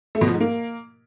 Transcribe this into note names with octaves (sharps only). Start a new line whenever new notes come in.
A3
B2
F3
G#2
A#3